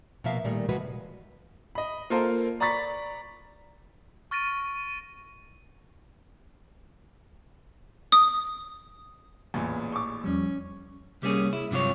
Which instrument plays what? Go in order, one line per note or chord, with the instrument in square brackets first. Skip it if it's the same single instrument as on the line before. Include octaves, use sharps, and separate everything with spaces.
[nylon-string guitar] B2 F3 A#3 E5 F5
A#2 D#3 G3 A3 A#3
C3 E3 F3 G#3 F#4 B4
[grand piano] D#5 B5
A#3 F4 A4 A#4 C5
D5 A#5 B5 C#6 A6 B6
[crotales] C#6 F6 A6 A#6 D7 D#7
[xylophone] D#6
[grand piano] A1 A#2 [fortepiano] E2
[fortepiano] C#6 D6
[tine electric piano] E2 F3 G3 [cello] C#4
[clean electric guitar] C2 G3 A#3 C#4 G#4
E4
G2 C3 F#3 F4 C#5